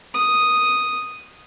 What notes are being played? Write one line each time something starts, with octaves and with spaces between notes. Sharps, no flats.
D#6